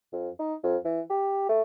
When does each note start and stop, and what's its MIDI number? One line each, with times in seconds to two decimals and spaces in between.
0.13 0.29 41
0.39 0.54 63
0.64 0.77 41
0.85 1.01 52
1.10 1.48 67
1.49 1.62 57